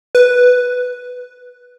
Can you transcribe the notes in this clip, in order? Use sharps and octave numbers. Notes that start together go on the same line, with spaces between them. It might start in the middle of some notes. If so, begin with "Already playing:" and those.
B4